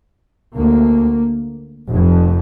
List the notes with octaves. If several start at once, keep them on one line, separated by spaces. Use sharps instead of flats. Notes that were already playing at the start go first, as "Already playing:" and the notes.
D2 A#3
F1 F2